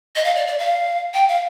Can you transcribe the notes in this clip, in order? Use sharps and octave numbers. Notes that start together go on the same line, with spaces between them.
D#5
F5
D5
D5
F5
G5
F5